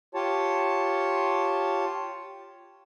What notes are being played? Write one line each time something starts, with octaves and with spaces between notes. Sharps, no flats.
F4 G4 C#5 A5